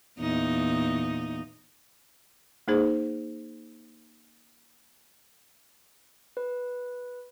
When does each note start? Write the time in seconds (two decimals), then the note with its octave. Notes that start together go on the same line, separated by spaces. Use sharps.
0.19 E2 A#2 D#4
2.68 A#3 D#4 G#4 C5
6.37 B4